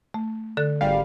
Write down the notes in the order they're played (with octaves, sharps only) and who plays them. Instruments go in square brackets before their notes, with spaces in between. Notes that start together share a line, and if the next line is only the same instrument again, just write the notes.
[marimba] A3
D3 A4 F#6
[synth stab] G#1 G3 F5